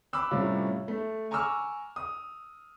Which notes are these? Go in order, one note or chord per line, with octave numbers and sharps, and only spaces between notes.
B5 D6 E6 F#6
A2 C3 G3 C#4 F4
A3
G#5 A#5 C#6 D6 E6 F6
D#6